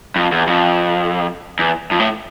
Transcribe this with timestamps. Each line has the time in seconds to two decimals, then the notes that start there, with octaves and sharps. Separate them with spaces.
0.16 F2
0.32 E2
0.47 F2
1.59 E2
1.91 F2
2.00 A2